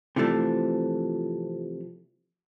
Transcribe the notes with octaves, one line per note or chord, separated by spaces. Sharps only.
C3 E3 F3 A3 D4